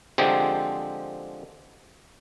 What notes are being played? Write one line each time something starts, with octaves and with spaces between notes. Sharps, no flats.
D3 F3 G#3 C4 G4 G#4